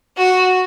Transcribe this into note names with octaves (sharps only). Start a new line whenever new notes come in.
F#4